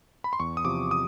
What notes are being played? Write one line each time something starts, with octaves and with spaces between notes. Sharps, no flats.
B5
C6
E2 C#6
D#6
C3 F3 D6
D#6